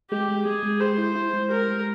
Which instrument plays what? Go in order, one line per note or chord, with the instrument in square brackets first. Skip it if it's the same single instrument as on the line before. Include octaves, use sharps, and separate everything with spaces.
[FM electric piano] G#3 [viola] G4
[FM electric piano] G#3
[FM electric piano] G#3 [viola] G#4
[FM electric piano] G#3
[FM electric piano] G4 [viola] C5
[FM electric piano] E4
E4
G#3
[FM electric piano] G4 [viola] A#4
[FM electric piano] G#3